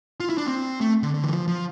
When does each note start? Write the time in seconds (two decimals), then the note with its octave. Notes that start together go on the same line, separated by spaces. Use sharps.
0.20 F4
0.29 E4
0.38 D4
0.47 C4
0.81 A3
1.03 D3
1.14 D3
1.24 E3
1.31 F3
1.48 F3